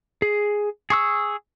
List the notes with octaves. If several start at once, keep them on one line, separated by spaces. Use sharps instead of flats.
G#4
G#4 C#6 E6